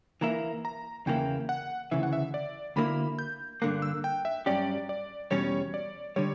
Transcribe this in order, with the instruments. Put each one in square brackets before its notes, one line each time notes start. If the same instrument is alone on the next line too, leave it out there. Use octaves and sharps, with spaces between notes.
[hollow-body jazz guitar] E3 A#3 E4 [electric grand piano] A#5
[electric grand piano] A#5
[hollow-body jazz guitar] E2 C#3 E3 A#3 E4 [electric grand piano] G5
[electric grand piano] F#5
[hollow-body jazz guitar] D2 C#3 E3 [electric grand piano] E5
[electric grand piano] F#5
E5
D5
[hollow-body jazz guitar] D2 D3 A#3 E4 [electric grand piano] B5
[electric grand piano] G6
[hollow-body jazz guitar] G2 D3 A#3 [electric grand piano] F#6
[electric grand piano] E6
G5
E5
[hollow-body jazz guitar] G2 F#3 C#4 G4 [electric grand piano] D5
[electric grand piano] D5
[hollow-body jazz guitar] E2 B2 G3 C#4 [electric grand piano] C#5
[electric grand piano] D5
[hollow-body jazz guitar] D3 G3 [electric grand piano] C#5